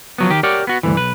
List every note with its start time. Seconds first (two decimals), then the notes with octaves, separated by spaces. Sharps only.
0.18 F3 F#3 B3
0.30 D#3 G4
0.43 G4 A#4 C#5 D5 F#5
0.67 B3 F#4
0.83 D2 G2 D3 E3
0.96 B1 B4